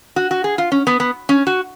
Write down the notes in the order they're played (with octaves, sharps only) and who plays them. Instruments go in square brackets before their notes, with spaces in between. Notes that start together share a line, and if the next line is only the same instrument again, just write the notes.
[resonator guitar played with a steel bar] F#4
F#4
G#4
F4
C#4
B3
B3
C#4
F#4